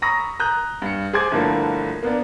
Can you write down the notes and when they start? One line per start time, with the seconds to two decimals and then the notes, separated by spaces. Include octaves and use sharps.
0.02 A#5 B5 C#6 D#6 E6 A#6
0.40 A#5 D#6 F#6 G6
0.82 G2 C#7
1.13 G#4 C5 G#5 D6 G#6
1.31 G1 A2 D3 F3 A#3 A4
2.03 A#3 B3 D4